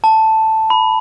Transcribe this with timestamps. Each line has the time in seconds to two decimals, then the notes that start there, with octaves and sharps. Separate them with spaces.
0.04 A5
0.70 B5